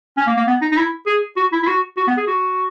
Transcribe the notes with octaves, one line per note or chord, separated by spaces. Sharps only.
C#4
A#3
A#3
B3
D#4
D#4
E4
G#4
F#4
E4
E4
F#4
F#4
B3
G#4
F#4